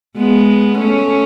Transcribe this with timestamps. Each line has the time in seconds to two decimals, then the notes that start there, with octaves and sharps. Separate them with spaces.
0.17 G#3 B3
0.78 A3 C#4